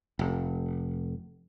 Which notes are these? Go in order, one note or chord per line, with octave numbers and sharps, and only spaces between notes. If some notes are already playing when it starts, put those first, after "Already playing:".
F1